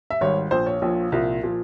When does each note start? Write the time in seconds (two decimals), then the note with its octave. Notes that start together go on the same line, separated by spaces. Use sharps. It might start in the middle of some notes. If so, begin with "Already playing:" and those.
0.10 E5
0.21 G#1 G#2 G3 C#5
0.51 A#1 A#2 F3 C5
0.66 C#5
0.82 A#1 A#2 F3
1.12 C2 A#2 F3
1.43 A#2 F3